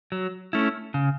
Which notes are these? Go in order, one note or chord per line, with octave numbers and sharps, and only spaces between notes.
F#3
A3 C#4 E4
C#3